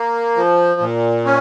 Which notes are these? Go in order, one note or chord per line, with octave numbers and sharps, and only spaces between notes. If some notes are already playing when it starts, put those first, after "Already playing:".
Already playing: A#3
F3
A#2
C#4